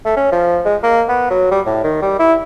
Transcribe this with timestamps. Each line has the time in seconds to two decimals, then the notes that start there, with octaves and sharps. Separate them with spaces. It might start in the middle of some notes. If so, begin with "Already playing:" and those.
0.05 A3
0.17 C#4
0.32 F3
0.65 G#3
0.83 A#3
1.09 B3
1.31 F#3
1.51 G3
1.66 A2
1.84 D#3
2.02 G3
2.19 E4